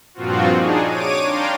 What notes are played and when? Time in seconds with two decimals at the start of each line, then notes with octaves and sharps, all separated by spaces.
0.14 G2 A#2 F3 C4 F4 F#4
0.52 D4 D#4 G#4
0.86 C#5 D6 D#7
1.25 D4 F5 G5 A#5 C6